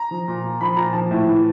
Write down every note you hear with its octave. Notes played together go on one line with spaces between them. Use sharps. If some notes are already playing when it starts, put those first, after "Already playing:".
Already playing: A#5
F3
A#2
A#2
F3 B5
A#2 A#5
F3 A5
A2
E3